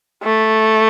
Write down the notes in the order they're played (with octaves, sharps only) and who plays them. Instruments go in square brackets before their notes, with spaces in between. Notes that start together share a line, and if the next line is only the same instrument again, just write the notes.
[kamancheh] A3